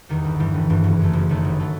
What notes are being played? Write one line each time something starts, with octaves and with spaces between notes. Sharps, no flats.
E2 D#3 G3
G1
G2 E3 G3
G1
G2 E3 G3
F#1
F#2 D#3 A3
F#1
F#2 D#3 A3
G1
F#3 A3